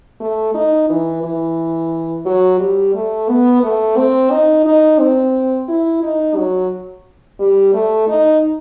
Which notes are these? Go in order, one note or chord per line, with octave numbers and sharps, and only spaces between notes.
A3
D#4
E3
E3
F#3
G3
A3
B3
A3
C4
D#4
D#4
C4
E4
D#4
F#3
G3
A3
D#4